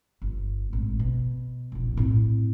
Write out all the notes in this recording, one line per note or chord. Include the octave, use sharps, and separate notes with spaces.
G1
G#1 A2
B2
F1 A#1
A2 C4